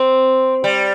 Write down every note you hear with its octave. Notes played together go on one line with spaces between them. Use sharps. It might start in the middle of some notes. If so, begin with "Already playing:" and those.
Already playing: C4
G3